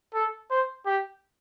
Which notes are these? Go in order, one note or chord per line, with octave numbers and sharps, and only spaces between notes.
A4
C5
G4